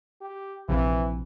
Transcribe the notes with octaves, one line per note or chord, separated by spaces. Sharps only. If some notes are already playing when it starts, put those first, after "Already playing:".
G4
A#1 C3 E3 F3